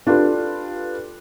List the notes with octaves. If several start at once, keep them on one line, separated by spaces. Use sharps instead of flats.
D4 F4 G4 A4 B4